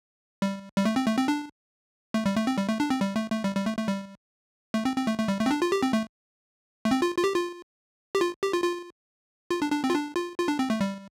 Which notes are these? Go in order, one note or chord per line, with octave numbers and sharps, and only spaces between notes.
G3
G3
A3
C4
A3
C4
D4
A3
G3
A3
C4
G3
A3
D4
C4
G3
A3
A3
G3
G3
A3
A3
G3
A3
C4
C4
A3
A3
G3
A3
C4
D4
F4
G4
C4
A3
A3
C4
F4
F4
G4
F4
G4
F4
G4
F4
F4
F4
D4
D4
C4
F4
D4
F4
F4
D4
C4
A3
G3